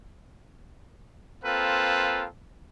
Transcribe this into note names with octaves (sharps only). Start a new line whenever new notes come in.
A#3 C4 F4 A4 B4